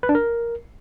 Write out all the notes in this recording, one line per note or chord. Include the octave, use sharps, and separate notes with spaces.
B4
D4
A#4